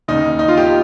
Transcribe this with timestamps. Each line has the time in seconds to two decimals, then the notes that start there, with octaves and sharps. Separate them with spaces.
0.08 D#2 C#3 D#4
0.39 D#4
0.48 F4
0.57 G4